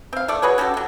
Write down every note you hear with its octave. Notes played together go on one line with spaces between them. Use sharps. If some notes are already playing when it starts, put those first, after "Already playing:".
C4 F5
A3 A4 D5
F#4 G#4 B4 C#5
C#4 F#4 G4 A4
F#3 A4